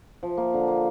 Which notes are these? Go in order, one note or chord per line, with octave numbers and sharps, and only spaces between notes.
F3
A#3
D3
A#3